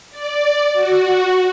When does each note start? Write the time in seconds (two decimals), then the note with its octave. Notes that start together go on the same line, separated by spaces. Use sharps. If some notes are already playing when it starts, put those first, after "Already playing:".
0.11 D5
0.73 F#4